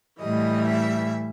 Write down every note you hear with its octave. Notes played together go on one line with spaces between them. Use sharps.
A2 E3 G3 D#5
E5